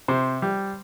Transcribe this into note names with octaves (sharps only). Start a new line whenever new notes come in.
C3 C5
G3